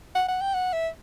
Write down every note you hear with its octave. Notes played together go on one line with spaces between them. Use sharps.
F#5
F#5
G5
F#5
E5